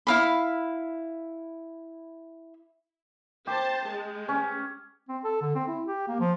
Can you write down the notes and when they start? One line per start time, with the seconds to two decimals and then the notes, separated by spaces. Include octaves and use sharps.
0.07 E4 F5 B5
3.47 G4 C5 A5
3.90 G#3
4.29 C#4
5.09 C4
5.24 A4
5.42 D3
5.55 C4
5.68 E4
5.86 G4
6.08 A#3
6.20 F3